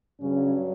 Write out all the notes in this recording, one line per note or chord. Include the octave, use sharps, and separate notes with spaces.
G2 C#3 F#3 C#4